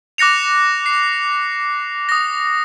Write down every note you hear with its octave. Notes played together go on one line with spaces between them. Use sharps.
D6 F#6 A#6 C#7 F7
C7
D#6 A#6